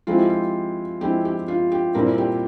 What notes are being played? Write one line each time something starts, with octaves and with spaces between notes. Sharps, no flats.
F3 G#3 C4 E4 F4
G4
F4
F3 G#3 C4 E4 G4
G4
F4
G4
A#2 G3 C4 E4 A#4
G4